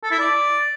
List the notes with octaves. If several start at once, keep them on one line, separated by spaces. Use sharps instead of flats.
A4
E4
D5